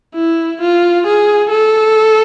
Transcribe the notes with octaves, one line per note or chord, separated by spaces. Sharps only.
E4
F4
G#4
A4